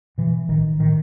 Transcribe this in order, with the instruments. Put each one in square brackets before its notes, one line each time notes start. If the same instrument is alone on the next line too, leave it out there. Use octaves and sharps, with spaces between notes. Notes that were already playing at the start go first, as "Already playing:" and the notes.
[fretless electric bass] B2 E3
A1 D#3
A2 D#3